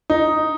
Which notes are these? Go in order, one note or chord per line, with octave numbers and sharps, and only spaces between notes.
D#4